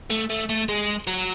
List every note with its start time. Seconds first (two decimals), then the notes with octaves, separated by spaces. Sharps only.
0.10 A3
0.30 A3
0.49 A3
0.69 G#3
1.07 F#3